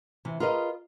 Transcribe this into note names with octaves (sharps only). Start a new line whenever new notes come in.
C3 E3
F4 G#4 A#4 B4 D#5